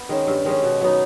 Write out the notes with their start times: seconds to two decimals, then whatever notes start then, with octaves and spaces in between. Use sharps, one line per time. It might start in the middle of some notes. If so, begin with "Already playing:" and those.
Already playing: B3
0.09 D#3 G#3 C#4
0.27 G2
0.44 D#3 G#3 C#4
0.63 B2
0.81 F#3 B3 D#4